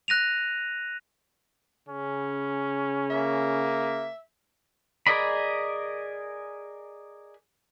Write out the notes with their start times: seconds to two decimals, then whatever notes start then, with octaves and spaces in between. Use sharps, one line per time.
0.08 F#6 A#6 D#7 F7
1.89 C#3 C#4
3.10 A#3 E5
5.07 G#4 A#4 D5 D#5 B5